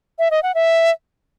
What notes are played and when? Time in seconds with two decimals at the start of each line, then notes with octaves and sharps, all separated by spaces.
0.19 E5
0.31 D#5
0.43 F#5
0.55 E5